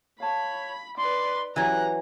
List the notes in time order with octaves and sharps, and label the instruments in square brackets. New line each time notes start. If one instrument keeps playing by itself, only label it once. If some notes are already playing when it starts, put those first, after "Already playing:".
[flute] C#5 [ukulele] F5 A5 [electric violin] B5
[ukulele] D#4 [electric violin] B4 D5 [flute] C6
[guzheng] E3 F#3 [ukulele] G4 B4 [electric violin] A#5 [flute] F#6